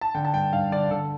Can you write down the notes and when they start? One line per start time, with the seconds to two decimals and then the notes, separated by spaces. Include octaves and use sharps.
0.01 A5
0.15 D3 G5
0.25 A5
0.34 G2 G5
0.53 G2 F5
0.72 D3 D5
0.90 D3 A4